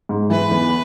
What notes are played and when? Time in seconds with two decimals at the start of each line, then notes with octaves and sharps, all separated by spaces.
0.09 G#2
0.30 E3 B4
0.51 E2